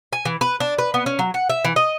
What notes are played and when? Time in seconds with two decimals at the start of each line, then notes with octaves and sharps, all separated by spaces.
0.13 G#5
0.25 E3
0.41 B4
0.60 D4
0.78 B4
0.94 B3
1.06 C#4
1.19 F#3
1.34 F#5
1.49 E5
1.65 E3
1.76 D#5